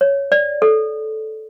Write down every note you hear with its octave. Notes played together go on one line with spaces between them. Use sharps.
C#5
D5
A4